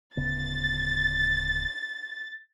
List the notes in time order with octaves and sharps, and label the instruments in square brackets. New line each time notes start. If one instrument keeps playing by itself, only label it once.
[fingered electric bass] D1 C#3 B3 [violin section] A6